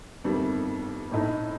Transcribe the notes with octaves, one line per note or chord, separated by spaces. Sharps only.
G1 F2 D#3 G3
A#1 A2 A3 D#4